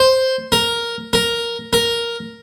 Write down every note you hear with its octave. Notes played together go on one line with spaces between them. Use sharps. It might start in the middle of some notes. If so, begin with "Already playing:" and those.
Already playing: C5
A#4
A#4
A#4